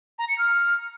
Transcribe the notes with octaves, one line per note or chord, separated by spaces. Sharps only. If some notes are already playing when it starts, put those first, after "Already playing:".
A#5
C#7
F6